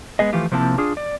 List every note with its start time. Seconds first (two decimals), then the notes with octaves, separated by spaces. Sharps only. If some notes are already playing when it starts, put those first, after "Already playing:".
0.19 G#3 B3 G#4 D#5
0.33 E3 F3 A3 F4 G4
0.52 C3 F3 A#3 C4 E4 A5
0.78 D4 F4 G#4
0.97 D5